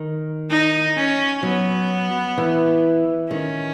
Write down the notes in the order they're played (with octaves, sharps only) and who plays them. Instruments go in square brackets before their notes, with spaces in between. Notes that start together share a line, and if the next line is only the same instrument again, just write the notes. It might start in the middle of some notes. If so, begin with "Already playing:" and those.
Already playing: [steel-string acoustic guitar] D#3
[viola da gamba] D#4
C#4
[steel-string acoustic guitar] F#3 [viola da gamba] B3
[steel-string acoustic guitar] E3
[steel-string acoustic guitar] D#3 [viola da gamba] C#4